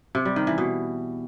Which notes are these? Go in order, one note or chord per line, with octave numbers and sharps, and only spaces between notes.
C3
G3
D#3
E3
B2